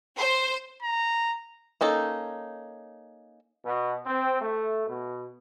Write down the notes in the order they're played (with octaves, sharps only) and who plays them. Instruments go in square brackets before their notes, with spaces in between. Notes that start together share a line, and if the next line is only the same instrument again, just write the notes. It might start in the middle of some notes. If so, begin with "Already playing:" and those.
[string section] C5
[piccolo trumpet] A#5
[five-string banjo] A#3 C#4 D#4 A4
[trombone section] B2
C4
A3
B2